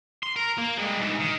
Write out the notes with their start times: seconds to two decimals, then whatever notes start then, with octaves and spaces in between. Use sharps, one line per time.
0.23 C6
0.36 A#4
0.58 A#3
0.78 G2 G#3
1.00 D2 G#2
1.19 D#3